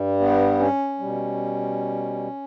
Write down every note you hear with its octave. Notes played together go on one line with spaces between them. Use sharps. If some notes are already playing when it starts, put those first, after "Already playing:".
Already playing: G2 G3
B3
C#4
B2 G3